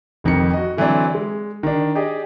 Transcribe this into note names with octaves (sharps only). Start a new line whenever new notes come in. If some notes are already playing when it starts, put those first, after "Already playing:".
F1 F2 D#3 C#7
F#4 D#5
D3 E3 F#3 C4 D4
G#3
D#3 D4
G4 G#4 D5 D#5